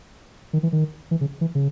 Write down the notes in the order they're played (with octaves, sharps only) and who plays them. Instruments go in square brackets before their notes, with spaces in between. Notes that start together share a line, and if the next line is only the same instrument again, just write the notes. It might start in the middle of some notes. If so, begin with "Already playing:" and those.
[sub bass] D#3
E3
D#3
E3
C#3
E3
C#3